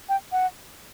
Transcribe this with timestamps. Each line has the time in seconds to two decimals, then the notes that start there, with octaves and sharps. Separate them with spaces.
0.09 G5
0.32 F#5